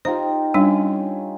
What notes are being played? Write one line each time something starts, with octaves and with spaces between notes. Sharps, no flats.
D#4 F4 G4 C5
G3 C#4 D4 F4